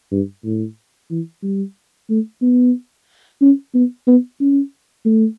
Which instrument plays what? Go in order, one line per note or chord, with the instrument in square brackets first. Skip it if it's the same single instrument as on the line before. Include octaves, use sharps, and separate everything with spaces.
[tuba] G2
A2
E3
G3
A3
B3
C#4
B3
B3
C#4
A3